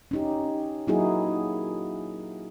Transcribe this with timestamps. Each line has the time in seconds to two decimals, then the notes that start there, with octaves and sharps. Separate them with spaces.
0.11 C#4 D#4 G4
0.87 F#3 A#3 D#4 E4 F#4 G#4